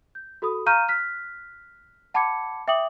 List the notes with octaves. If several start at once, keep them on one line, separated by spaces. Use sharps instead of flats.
G6
F#4 A4 B5 D#6
F5 A#5 C#6 F6 G6 D#7
F6 F#6 B6
F#5 A5 B5 D6 G#6 C#7
E5 G5 D6 D#6 F#7